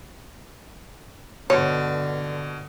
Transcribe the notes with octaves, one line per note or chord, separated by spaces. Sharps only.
G2 B2 D3 C#5